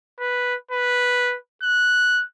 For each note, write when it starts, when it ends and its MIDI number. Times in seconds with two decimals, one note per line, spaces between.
0.20 0.55 71
0.71 1.36 71
1.63 2.23 90